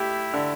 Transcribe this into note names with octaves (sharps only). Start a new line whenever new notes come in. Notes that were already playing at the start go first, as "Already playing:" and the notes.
Already playing: A3 E4 G4
D3